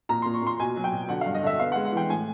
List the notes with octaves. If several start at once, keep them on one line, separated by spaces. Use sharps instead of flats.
A#2 A#5
A#2 C6
C#6
A#2 C6
B2 G#5
F#3
G5
B2
D3 F#5
G2 F5
D#5
D3 E5
B3 F5
G#3 F#5
F#5
E3 G5
A2 G#5